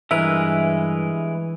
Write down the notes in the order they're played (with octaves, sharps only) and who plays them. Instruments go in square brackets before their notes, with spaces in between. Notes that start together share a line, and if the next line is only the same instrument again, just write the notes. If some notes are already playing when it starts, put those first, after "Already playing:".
[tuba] G2 [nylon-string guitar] E3 [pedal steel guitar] G#3 A#4 B4 [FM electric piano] E5